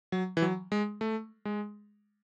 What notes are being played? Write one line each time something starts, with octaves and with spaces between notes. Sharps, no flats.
F#3
E3
F#3
G#3
A3
G#3